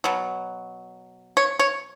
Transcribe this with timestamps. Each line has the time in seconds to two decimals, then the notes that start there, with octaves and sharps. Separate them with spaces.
0.04 B2 F#3
1.37 C#5
1.59 C#5